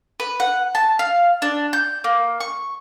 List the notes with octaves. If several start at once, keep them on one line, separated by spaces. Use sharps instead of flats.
B4
F#5
A5
F5
D4
G6
A#3
C#6